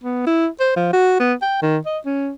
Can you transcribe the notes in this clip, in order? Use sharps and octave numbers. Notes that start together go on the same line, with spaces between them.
B3
E4
C5
F3
F#4
B3
G5
D#3
D#5
C#4